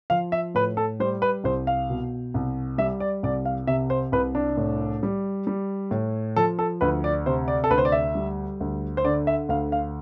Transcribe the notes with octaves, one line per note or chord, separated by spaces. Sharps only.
F3 F5
E5
A2 B4
A4
G3 C5
B4
C2 C5
F5
B2
C2
G3 E5
D5
C2 D5
F5
C3 E5
C5
C2 B4
D4
A2
G3
G3
A2
F3 A4
A4
D2 B4
D5
C3 C5
D5
A4
D2 B4
C5
D5
E5
G3
D2
C5
D3 D5
E5
D2 F5
F5